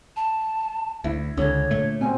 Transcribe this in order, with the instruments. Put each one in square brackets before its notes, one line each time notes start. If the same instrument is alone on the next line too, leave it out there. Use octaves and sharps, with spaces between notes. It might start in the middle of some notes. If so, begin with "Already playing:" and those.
[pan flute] A5
[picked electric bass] D2 [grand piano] E4
[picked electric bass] C#2 [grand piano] D3 [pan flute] C#5
[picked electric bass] A#2 A3
[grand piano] B2 C4 [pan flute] G#5